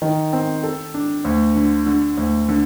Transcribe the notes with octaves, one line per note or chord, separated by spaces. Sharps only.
D#3
C4
A4
D4
D2
D3
D3
D2
D3